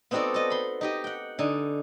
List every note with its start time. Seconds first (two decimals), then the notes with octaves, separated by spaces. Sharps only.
0.11 B3 C4 D#4 F#4 A4 D5
0.34 D#5 A5
0.50 B5 C6
0.81 D#4 G4 D#5
1.04 F#5 G5
1.39 D3 D#4 G#5